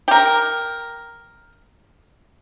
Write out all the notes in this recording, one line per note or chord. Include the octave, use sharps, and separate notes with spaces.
G4 A#4